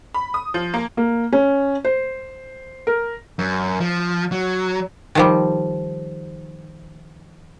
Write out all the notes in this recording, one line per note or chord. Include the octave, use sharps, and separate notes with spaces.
B5
D#6
F3
A#3
A#3
C#4
C5
A#4
F#2
F3
F#3
D#3 F3 G3